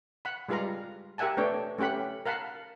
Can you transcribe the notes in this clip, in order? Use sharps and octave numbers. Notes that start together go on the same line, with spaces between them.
F#5 B5
G3 G#3 F4 B4 F5 A#5
G4 A#4 E5 F#5 G#5 A5
A3 B3 D4 C#5 G5
A3 C#4 G4 F#5 B5
A#4 F5 F#5 A5 B5